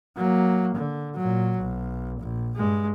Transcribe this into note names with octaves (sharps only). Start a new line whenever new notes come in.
F#3 A#3
D3
A#2 F#3
B1
A#1
G2 G#3